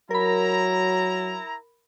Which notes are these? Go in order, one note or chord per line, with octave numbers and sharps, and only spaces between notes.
F#3 E4 A#4 A#5 B5